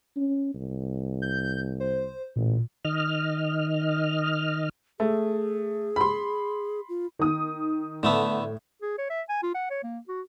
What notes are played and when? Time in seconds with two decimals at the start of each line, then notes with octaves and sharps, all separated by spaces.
0.16 C#4
0.54 C2
1.22 G6
1.80 C5
2.36 A1 A#2
2.85 D#3 D#5 F6
5.00 A3 G#4
5.96 B5 C6
6.89 F4
7.19 D#3 D#6
8.03 A2 D3 A3 B3
8.82 G#4
8.98 C#5
9.10 E5
9.29 G#5
9.43 F4
9.54 F#5
9.70 C#5
9.84 A#3
10.08 F#4